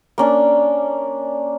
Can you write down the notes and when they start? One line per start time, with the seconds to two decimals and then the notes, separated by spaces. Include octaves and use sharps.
0.18 A#3 C#4 D4